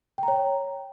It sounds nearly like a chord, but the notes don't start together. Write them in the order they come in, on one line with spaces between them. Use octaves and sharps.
G5 A#5 C#5